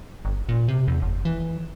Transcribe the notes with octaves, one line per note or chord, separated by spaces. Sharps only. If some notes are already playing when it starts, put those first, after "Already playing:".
G1
A#2
C3
E2
F#1
E3